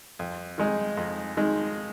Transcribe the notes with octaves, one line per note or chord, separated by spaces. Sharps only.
F2
D#3 G#3 D#4
F2
D#3 G#3 D#4